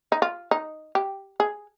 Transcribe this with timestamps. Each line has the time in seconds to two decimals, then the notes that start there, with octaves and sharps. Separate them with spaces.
0.12 D#4
0.22 F4
0.51 D#4
0.95 G4
1.40 G#4